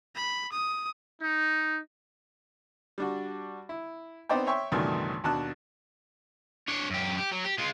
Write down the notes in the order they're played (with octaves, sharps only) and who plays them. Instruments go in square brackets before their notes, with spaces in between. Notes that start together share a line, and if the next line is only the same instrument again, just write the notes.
[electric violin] B5
D#6
[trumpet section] D#4
[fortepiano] G3 D4 F#4
E4
B3 C4 D#4 C5 D5 G5
C#5 E5 G5 C6 C#6
C#2 G2 B2 D#3 E3 A3
D#2 B2 D4 A5 F#6
[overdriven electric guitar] D4 C#5
F#2 G4
G4
F#3
G4
G#3 F4